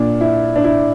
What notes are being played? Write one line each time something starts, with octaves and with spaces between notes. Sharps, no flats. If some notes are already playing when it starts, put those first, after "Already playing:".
Already playing: A#2 D4
E4
D4
E4